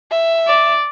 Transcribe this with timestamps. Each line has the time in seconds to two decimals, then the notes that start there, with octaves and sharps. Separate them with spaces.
0.11 E5
0.47 D5